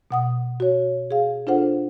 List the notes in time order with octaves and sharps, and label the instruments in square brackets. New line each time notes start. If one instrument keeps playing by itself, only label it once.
[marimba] B2 F#5 D#6
F#4 C#5
G#4 F5
D4 F4 A4 C5 F#5